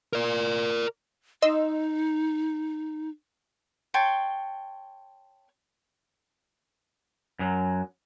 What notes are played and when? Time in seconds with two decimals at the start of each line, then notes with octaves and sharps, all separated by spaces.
0.13 A#4 D5
1.42 D#4 D#5 C6 E6
3.94 C#5 G5 A5 C6
7.39 F#2 F#3